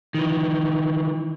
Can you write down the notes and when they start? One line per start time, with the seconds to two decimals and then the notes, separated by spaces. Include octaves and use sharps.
0.14 D#3 E3